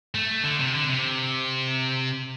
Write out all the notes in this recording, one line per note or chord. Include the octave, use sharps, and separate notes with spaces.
A3
D3
C3
D3
C3